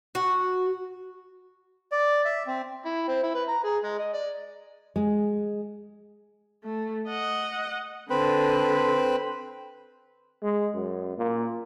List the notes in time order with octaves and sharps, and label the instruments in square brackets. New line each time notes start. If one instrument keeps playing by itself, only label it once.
[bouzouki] F#4
[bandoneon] D5
E5
C4
[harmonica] E4
C4
E4
B4
A#5
G#4
G#3
D#5
D5
[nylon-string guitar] G#3
[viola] A3
D#5 F#5
[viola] D3 [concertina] C4 B4
[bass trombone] G#3
F#2
A#2